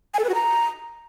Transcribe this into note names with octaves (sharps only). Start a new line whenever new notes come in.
G#5
A4
B4
F#4
A#5